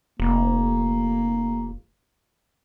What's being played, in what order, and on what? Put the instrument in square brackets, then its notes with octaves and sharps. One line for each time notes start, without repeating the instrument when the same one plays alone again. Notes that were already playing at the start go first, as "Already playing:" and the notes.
[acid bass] F1 [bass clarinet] A#3